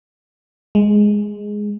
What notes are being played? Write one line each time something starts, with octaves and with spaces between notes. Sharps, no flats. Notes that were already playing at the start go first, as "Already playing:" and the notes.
G#3